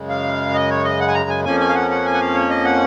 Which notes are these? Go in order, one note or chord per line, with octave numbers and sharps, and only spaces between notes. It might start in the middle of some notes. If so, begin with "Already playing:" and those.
Already playing: F#2 C#3 G#3
F5
D#5
C#5
D#5
F#5
G#5
A#5
G#5
F2 F3 A#3 C#4 G#5
G#5
F5
F#5
F#5
G#5
F#5
F5
C#5
D#5
F#5